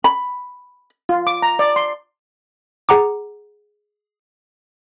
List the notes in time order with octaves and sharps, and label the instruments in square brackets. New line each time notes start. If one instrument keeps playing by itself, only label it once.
[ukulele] B5
[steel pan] F4
D6
A#5
D5
C6
[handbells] G#4 F#5 A#5 D6